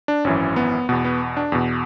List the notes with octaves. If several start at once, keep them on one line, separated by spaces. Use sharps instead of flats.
D4
G#1 F#2 E3 C#4
B3
E2 B2 B3
B3
D4
E2 B2